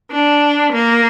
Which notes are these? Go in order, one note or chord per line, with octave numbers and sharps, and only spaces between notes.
D4
A#3